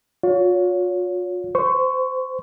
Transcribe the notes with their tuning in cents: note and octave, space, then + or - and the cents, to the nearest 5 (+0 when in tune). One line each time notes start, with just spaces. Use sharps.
F4 +40 C#5 +25
C5 -25 C#6 +0